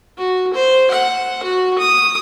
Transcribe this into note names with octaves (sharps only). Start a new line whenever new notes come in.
F#4
C5
F#5
F#4
D#6